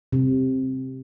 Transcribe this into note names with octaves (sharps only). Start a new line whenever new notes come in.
C3